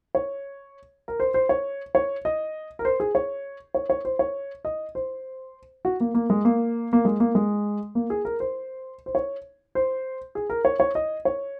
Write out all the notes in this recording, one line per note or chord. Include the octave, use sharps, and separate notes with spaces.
C#5
A#4
C5
C5
C#5
C#5
D#5
A#4
C5
G#4
C#5
C#5
C#5
C5
C#5
D#5
C5
F#4
A#3
A#3
G#3
A#3
A#3
G#3
A#3
G#3
A#3
G#4
A#4
C5
C5
C#5
C5
G#4
A#4
C#5
C#5
D#5
C#5